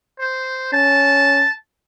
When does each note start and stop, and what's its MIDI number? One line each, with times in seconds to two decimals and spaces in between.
0.19 0.71 72
0.73 1.43 61
0.73 1.51 81